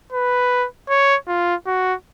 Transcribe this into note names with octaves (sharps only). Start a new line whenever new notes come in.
B4
C#5
F4
F#4